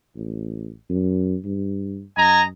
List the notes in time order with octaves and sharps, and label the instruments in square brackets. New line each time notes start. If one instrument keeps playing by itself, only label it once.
[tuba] A1
F#2
G2
[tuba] F#2 [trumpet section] D#5 G#5 A#5